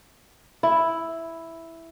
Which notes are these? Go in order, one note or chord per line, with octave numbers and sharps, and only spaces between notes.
E4